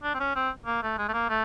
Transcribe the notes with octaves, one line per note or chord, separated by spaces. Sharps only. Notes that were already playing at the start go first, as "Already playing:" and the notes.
D4
C4
C#4
C4
A#3
A3
G#3
A3
A#3
A3